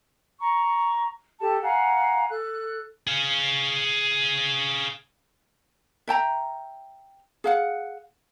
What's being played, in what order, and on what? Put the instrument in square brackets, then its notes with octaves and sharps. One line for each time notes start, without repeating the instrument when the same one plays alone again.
[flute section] A#5 C#6
G4 A4 A5
F5 F#5 G#5 A#5
A4 F#6
[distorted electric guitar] G#4 F5
[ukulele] E5 G5 A5 A#5
G#4 F5 F#5